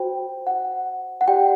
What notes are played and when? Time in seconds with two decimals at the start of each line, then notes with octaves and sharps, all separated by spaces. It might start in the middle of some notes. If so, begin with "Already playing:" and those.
Already playing: F#4 C5 G5
0.47 F#5
1.21 F#5
1.28 G4 D5 G5